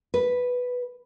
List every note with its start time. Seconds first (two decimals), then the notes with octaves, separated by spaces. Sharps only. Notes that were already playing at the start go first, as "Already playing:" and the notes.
0.14 B4